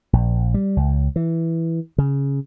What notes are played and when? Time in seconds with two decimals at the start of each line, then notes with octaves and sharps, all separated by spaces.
0.13 A#1
0.54 G3
0.77 C#2
1.16 E3
1.98 C#3